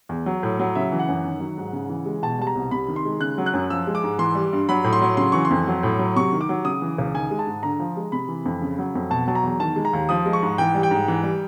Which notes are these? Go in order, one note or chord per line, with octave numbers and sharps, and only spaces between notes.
E2
F#3
A2
F#3
C#3 E5
E3
F#5
F#2
D#3
F#3
G#2
C#3
E3
G#3
B2 A5
G3 A5
A#5
C2
C3 B5
D#3
C6
G#3
C#3 F#6
F#3
F#6
F#2
F3 E6
G#3
D6
G#2
E3 C6
G3
G2
F#3 B5
A2
C6
F#3
C#3 C6
E3 C#6
C6
F2
F#3
A2
F#3
C3 C#6
D#3
D6
F#3
C#3 D#6
E3
C#2
D#3 G#5
G#3
A5
G#2
D3 A#5
F3
G#3
C3 B5
E3
F2
C#3
F#3
F2
B2 A5
F#3 A5
A#5
E2
D#3 A5
G#3
A#5
D#2
F3 D#6
G#3
C#6
G#2
E3 G5
G3
G5
G#2
E3
G3